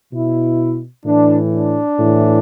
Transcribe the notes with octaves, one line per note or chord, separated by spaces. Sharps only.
B2 E4
A2 E3 D4
D4
A2 E3